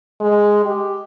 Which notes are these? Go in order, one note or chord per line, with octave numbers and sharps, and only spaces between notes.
G#3
G4